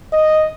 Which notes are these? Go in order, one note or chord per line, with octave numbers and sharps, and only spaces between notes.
D#5